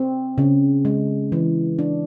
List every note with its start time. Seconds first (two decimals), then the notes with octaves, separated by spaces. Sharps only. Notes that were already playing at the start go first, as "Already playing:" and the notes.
Already playing: C4
0.38 C#3
0.85 G#3
1.32 E3
1.79 D4